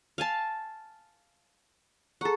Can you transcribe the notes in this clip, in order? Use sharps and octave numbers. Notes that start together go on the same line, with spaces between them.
F5 G#5 A5
G#4 A4 F#5 A#5 C#6